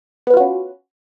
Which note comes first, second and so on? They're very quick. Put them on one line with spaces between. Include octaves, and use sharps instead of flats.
B3 B4 F4 F#4 C#4